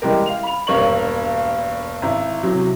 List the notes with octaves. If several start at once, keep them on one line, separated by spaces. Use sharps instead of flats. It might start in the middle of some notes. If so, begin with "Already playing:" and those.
E3 G3 G#3 G4 A#4
F5 F7
B5 F7
E1 G2 A#3 C#5 C#6 F#7
G#1 E4
A2 C3 F#3